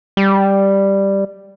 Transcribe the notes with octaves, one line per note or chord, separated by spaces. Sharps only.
G3